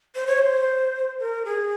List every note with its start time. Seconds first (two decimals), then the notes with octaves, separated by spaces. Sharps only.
0.15 C5
0.27 C#5
0.39 C5
1.20 A#4
1.45 G#4